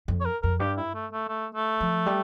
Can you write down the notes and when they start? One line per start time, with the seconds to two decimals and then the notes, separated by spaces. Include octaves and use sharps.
0.08 F2
0.20 C#5
0.25 A#4
0.42 F2 A#4
0.60 G2 G4
0.77 E4
0.94 A3
1.12 A3
1.28 A3
1.55 A3
1.81 F3
2.06 G3